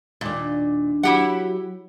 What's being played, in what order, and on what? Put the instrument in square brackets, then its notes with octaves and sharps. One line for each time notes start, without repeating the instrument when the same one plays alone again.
[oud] D#2 D4 [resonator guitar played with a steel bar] A#2
[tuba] F#3 [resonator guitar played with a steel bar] E4 G4 F#5